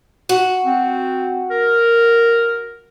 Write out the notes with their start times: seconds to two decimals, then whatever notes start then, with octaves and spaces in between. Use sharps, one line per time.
0.29 F#4
0.65 C4
1.51 A#4